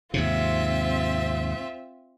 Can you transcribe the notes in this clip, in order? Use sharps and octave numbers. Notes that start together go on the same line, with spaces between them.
D#2 G#2 C3 C4 F4 E5